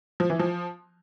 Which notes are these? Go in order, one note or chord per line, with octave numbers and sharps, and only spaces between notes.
F3
E3
F3